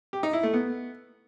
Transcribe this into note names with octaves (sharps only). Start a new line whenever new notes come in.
G4
D#4
E4
A3
B3